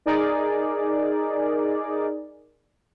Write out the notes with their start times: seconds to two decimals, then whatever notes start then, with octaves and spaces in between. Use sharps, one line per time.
0.06 D#4 G#4 A#4 D5